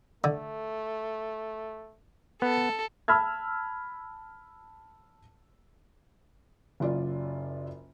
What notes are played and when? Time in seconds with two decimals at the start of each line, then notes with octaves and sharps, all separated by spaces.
0.24 D3 A3
2.42 B3 A4
3.08 A5 B5 E6 F6 G#6
6.80 F#1 F#2 F4 D5